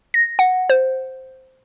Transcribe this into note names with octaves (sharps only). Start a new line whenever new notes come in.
A#6
F#5
C5